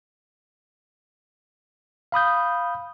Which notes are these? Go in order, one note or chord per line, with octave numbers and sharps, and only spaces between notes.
F5 B5 D#6 G6